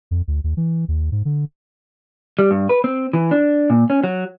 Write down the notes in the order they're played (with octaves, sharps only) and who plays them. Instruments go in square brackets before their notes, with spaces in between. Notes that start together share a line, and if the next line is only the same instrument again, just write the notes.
[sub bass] F2
D2
D#2
E3
D#2
G#2
D3
[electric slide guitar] G3
G2
B4
C4
E3
D4
A#2
C#4
F#3